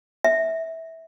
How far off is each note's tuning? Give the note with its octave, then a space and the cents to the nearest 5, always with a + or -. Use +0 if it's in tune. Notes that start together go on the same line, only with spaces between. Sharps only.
E5 -15